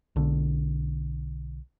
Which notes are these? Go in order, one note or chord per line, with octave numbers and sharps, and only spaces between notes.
B1 D3